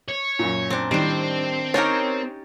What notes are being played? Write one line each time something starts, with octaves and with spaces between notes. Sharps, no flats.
C#5
F#2 A#2
C4 D4
A2 D#3 G3 C4 D4
C#4 D#4 G4 A#4 C#5 A6